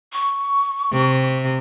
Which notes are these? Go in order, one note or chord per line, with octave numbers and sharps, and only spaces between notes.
C#6
C3